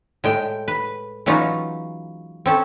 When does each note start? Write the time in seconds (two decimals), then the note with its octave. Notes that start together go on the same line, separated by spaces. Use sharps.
0.24 A2 G#3 G5
0.68 B4
1.26 E3 F#3 G#3 C#4 D#4 F4
2.46 C4 C#4 A4